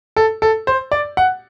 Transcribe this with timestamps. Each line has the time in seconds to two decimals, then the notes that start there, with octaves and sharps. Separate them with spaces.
0.16 A4
0.42 A4
0.67 C5
0.92 D5
1.17 F#5